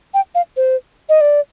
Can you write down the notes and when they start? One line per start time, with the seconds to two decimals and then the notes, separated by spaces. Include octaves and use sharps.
0.14 G5
0.35 F5
0.57 C5
1.09 D#5
1.21 D5